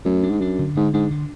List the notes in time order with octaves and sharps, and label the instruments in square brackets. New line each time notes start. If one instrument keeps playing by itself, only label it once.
[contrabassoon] F#2 [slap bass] A3
[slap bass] D4
[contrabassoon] G#2
[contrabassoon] F#2 [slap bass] D4
[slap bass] D3
[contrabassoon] G#2 [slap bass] D3
[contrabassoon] G#2 [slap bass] D4
[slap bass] D3